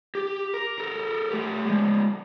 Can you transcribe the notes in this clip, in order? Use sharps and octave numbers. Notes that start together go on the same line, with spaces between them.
G4
A#4
A4 A#4
A3 G4
F3 G#3